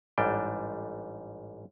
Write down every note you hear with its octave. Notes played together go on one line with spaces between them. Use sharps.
A1 G#2 G3 D4 G5